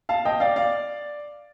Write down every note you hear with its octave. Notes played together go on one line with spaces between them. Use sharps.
F5 A5
D#5 G5
D5 F5
D5 F5